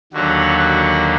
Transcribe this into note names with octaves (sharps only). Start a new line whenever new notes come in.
D#2 D3 F#3 F#4
F#4